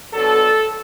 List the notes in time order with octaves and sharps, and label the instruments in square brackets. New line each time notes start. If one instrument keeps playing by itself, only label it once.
[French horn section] D3 F#3 B3 A4